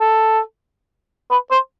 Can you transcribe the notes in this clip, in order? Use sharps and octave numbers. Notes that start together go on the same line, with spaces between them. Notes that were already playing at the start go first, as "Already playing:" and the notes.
A4
B4
C5